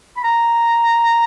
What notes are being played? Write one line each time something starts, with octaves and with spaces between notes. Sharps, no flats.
B5
A#5